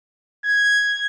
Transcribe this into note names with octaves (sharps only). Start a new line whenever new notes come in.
G#6